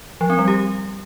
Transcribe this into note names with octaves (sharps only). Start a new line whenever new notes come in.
F3
C4
G3
G4